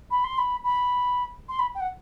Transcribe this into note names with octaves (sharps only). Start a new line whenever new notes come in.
B5
C6
B5
B5
C6
B5
G5
F#5